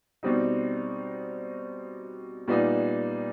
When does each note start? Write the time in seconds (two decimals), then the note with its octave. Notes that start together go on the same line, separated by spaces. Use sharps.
0.23 B2 G3 C4 D#4
2.48 A#2 G3 B3 D#4